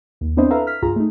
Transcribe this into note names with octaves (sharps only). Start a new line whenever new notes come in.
D#2
B3 C4 D4 E4 C5 D#5
A4 B4 E5 F5 A#5
F6 B6
C#2 G2 F4 G#4 A#5
A3 D#4